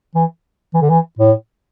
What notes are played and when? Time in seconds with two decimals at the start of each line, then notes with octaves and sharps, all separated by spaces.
0.15 E3
0.74 E3
0.82 D3
0.90 E3
1.19 A2